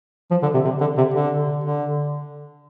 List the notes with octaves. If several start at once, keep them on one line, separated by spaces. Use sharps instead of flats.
F3
D3
C3
C3
D3
C3
D3
D3